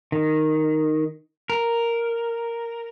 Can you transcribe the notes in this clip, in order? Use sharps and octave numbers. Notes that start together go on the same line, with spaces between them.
D#3
A#4